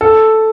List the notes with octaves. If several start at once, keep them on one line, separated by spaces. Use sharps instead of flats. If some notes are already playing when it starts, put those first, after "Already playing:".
A4